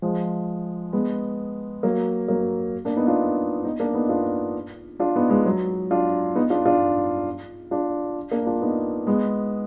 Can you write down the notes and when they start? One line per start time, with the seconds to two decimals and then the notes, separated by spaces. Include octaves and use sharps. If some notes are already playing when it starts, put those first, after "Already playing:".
0.02 F3 G#3
0.93 G#3 B3
1.83 F#3 A#3
2.28 F#3 A#3
2.85 A#3 D4
2.96 B3 D#4
3.07 D4 F4
3.64 B3 D#4
3.80 A#3 D4
3.94 B3 D#4
4.09 D4 F4
5.00 D4 F4
5.16 B3 D#4
5.30 G#3 B3
5.46 F#3
5.91 D4 F4
6.35 B3 D#4
6.50 D4 F4
6.66 D4 F4
7.71 D4 F4
8.31 A#3 D4
8.46 D4 F4
8.61 B3 D#4
9.07 G#3 B3